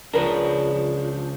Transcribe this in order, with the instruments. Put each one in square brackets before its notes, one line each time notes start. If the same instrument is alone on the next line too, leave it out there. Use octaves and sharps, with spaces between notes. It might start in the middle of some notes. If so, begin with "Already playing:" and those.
[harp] C#2 [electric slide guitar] F3 D4 [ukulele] A#4 B4